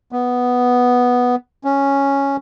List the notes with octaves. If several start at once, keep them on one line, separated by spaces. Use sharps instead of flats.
B3
C#4